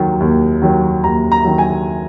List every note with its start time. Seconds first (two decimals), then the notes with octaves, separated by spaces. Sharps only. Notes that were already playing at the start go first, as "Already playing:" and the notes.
Already playing: D#2 D#3 F#3
0.20 D#2
0.62 D#3 F#3
1.04 D#2 A#5
1.32 A#5
1.44 D#3 F#3
1.58 G#5